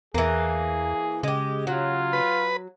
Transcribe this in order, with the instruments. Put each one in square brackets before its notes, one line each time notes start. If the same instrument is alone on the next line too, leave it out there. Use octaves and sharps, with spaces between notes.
[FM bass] E2 [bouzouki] E3 A#3 [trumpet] G#4
[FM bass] C#3 [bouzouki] G#3 G4
[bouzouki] F#3 [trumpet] F4
[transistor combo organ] B4